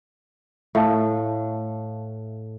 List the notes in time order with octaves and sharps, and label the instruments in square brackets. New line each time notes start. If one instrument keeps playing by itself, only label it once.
[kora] A2 [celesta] E5 F5 A5